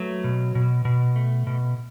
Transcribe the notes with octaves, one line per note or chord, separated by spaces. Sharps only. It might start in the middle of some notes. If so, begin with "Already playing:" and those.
Already playing: F#3 A3 B4
B2
B2
B2
A3
B2